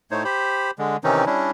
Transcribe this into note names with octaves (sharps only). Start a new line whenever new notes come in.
A2 A3 D#4 C5 C#5
G4 C5 B5
D3 G#3
C3 D#3 E3 C4 C#4 D#4
G3 C#4 D4 E4